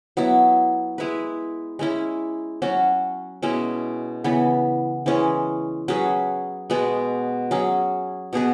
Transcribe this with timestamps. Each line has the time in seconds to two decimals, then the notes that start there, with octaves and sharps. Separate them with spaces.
0.17 F#3 B3 E4
0.98 G#3 E4 B4
1.79 G#3 C#4 E4
2.62 F#3 C#4 F#4
3.42 B2 G#3 C#4 E4
4.24 C#3 E3 B3
5.06 E3 G#3 C#4
5.88 F#3 C#4 G#4 B4
6.70 B2 G#3 B3
7.51 F#3 C#4 G#4
8.33 B2 B3 G#4 B4